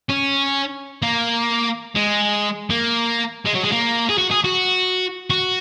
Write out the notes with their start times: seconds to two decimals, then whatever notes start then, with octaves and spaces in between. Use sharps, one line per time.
0.09 C#4
1.02 A#3
1.96 G#3
2.70 A#3
3.45 G#3
3.54 F#3
3.63 G#3
3.72 A#3
4.10 G#4
4.18 F#4
4.31 G#4
4.44 F#4
5.30 F#4